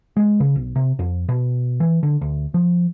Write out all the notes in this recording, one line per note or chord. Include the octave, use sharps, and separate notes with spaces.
G#3
C#3
B1
C3
F2
B2
E3
D3
D2
F3